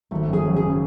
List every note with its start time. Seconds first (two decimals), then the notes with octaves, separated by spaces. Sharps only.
0.11 G#1 A3
0.28 F#2
0.33 G#4
0.45 F#2
0.56 G#4
0.62 C#3